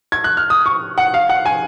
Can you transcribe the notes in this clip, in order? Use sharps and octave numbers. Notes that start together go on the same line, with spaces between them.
G#6
F#6
F6
D#6
C#6
F#5
F5
F#5
G#5